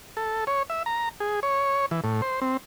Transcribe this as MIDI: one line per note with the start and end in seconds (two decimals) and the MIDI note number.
0.17 0.44 69
0.47 0.63 73
0.70 0.83 76
0.86 1.09 82
1.20 1.40 68
1.43 1.86 73
1.91 2.01 52
2.04 2.21 45
2.22 2.40 72
2.42 2.57 60